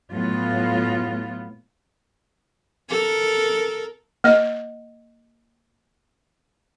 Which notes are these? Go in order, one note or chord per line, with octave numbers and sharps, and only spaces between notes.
A2 F#3 B3 F4
A4 A#4
A#3 D#5